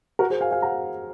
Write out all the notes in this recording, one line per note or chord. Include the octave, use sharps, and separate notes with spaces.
F#4 A#4
G#4 C5
F5 G#5
F5 G#5
F#5 A#5